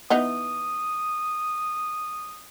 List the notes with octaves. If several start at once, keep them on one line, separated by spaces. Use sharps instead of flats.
E3 B3 D#4 D#6